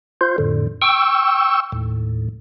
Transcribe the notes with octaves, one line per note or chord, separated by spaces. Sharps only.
F4 C5
F2 A2 D3
G5 C#6 E6
D#2 A2